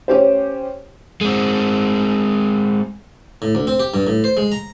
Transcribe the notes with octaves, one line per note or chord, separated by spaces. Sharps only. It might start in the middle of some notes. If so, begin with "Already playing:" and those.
C#4 G4 C5
G#3 C4
A2
D2
C4
G4
G2
A2
C5
G#3
A#5